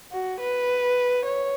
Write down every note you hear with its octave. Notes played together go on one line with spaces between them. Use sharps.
F#4
B4
C#5